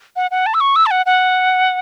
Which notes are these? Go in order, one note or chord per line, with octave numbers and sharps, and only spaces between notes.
F#5
F#5
A5
E6
C#6
E6
A5
F#5
F#5